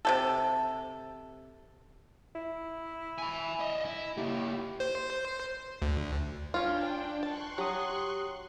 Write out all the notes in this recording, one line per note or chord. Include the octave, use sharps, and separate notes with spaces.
C3 G3 A4
E4
G#5 B5
D#5 E5
E4
A#3 E4 G4
C5
D2
C#4 D4 F4 G5
A5 C6 C#6 F#6
F#3 G4 D#6